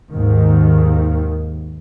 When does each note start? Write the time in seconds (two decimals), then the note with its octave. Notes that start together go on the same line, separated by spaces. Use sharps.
0.11 D#2 G#2 D#3